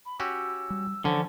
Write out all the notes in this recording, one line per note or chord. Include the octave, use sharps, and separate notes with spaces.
B5
C#4 F#4 G4 E6
G3
D3 E3 F3 C#4 C5